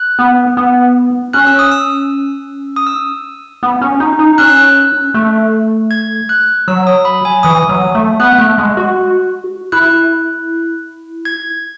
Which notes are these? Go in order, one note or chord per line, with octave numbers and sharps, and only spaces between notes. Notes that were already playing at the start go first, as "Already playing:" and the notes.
Already playing: F#6
B3
B3
C#4 F#6
E6
D#6
E6
D#6
E6
B3
C#4
D#4
D#4
C#4 F#6
E6
F#6
A3
G#6
F#6
F#3 E6
D#6
B5
G#5
E3 D#6
F#3
A3
B3 F#6
A3
G#3
F#4
E4 F#6
G#6